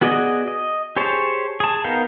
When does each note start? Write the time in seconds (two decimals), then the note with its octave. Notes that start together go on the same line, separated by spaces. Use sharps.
0.01 B3 F#4 G#4 D5 D#5
0.48 D#5
0.96 G4 G#4 C5 C#5 A5
1.60 G#4 A5
1.84 B3 D#4 A#4 F5 G5